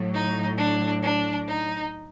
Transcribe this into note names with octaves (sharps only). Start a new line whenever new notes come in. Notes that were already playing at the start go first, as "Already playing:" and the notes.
Already playing: A2 F#3
D#4
D4
D4
D#4